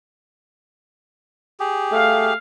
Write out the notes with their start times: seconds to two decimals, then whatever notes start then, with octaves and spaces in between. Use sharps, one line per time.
1.60 G4 G#4
1.92 A3 F5